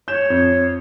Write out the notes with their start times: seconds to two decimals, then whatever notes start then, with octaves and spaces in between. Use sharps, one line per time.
0.08 C#5 G6 E7
0.30 F2